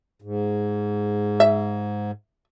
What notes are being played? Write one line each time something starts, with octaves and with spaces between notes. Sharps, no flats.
G#2
E5